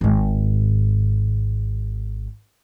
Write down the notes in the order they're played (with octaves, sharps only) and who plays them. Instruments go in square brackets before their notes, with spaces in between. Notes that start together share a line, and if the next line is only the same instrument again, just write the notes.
[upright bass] G#1 G#2